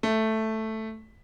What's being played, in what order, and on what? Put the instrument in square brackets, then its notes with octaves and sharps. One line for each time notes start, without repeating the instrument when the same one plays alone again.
[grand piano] A3